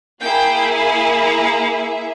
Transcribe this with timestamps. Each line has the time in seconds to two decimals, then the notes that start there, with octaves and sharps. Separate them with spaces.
0.22 A#3 E4 G#4 G5
0.73 G#5
1.23 A#5
1.74 E5